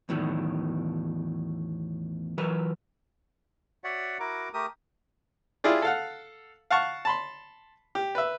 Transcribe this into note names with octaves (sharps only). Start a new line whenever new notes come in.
E2 A2 D#3 F#3
E3 F#3 A#4 B4
F#4 C#5 D5 E5 F#5
E4 F#4 A#4 A#5 D6
A3 G4 A#4 D#6
E4 F4 G4 G#4 D5
A4 F5 F#5
F5 F#5 A5 C#6
A5 B5 C6
G4
B4 E5